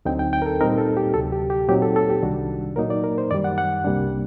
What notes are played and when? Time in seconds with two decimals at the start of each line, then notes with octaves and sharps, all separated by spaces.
0.05 D2 D3 F#3 C4 D#4 G5
0.19 G5
0.33 G5
0.42 A#4
0.46 A4
0.61 A#2 G3 C4 D#4 A#4
0.78 A4
0.97 G4
1.14 D2 C3 F#3 A4
1.32 G4
1.50 G4
1.69 A#2 F#3 C4 D#4 G4
1.82 A4
1.96 A4
2.10 G4
2.22 C2 C3 D#3 G3 D4 F#4
2.76 A#2 F#3 A#3 D#4 A#4
2.90 D5
3.04 A#4
3.18 C5
3.31 F#2 D#3 G3 D5
3.44 F#5
3.58 F#5
3.84 C2 C3 G3 A#3 D4